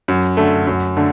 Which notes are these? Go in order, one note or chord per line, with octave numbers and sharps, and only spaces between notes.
F#2
D3 A3
F#2
D3 A3